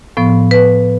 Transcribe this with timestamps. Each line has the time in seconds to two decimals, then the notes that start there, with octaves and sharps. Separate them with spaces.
0.17 A2 F3 B3
0.51 B4